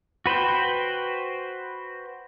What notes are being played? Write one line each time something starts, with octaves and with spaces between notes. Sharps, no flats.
F#4 B4 C5 G5